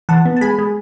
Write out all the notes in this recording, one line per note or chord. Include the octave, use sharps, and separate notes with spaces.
E3 F#5 A5
B3
A5
G#3 G#5 B5
G#3